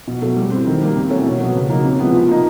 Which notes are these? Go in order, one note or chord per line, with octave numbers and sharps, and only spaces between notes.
B2
F#3 A3
G3
C4 E4
D#3
G3 A#3
C3
E3 A3 C#4 F#4
B2
F#3 B3
C#3
F#3 A#3 D#4
C3
F3 G#3 B3 E4
F3
A#3 D#4